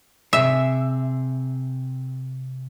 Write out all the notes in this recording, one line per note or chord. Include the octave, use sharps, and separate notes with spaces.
C3 G#4 E5